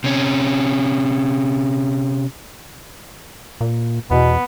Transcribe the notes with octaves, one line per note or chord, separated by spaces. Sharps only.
C3 C#4
A#2
E2 B2 B3